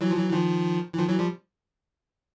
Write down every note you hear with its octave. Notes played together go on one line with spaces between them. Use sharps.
E3 F#3
F3
E3 F#3
E3
D#3 F3
E3
D#3 F3
E3 F#3
F3 G3